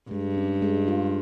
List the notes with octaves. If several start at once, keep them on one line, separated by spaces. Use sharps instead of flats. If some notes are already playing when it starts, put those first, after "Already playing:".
G2 G#3
C#4
G#3
F4